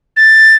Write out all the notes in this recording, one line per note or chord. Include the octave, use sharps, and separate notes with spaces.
A6